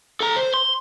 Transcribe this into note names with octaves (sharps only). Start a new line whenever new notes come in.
A4 A#5
C5
C6